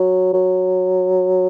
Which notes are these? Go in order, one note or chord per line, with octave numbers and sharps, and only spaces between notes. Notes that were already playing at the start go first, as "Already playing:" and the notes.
Already playing: F#3
F#3